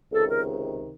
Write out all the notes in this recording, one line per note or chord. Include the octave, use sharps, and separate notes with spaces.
C#2 C3 D#3 A4
A#4